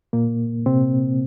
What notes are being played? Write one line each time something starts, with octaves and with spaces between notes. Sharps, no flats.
A#2 A#3
C3 C4